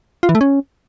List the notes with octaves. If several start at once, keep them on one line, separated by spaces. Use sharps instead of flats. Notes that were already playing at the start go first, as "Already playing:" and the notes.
F4
E3
A3
C#4